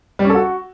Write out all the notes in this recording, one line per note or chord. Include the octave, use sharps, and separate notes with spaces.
G3
C#4
A4
F#4